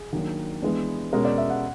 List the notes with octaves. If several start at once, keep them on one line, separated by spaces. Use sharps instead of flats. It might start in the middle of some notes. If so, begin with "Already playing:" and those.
Already playing: G#4
D#3 F#3 A#3 D4
E3 G#3 B3 D4
B2 G#3 C#4 A#4
D5
E5
F#5